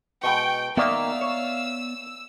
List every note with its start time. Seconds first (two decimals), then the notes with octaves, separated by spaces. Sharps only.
0.24 B2 G#3 G5 C#6
0.77 D#3 A#3 B3 D5 E5 F5 E6
1.21 C#5